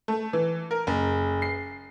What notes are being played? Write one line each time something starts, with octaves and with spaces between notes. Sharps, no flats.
A3
E3
A#4
F#1
C7